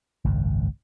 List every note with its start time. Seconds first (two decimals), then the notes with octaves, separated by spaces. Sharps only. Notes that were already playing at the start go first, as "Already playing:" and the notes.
0.24 G#1 C#2 F#2